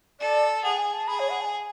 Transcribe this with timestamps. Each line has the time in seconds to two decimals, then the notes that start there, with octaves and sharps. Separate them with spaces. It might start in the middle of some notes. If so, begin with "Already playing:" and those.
0.20 A4 D5
0.63 G#4 F#5
0.78 G#5
0.93 A5
1.08 G#4 B5
1.19 C#5
1.29 F#5
1.41 A5
1.45 G#5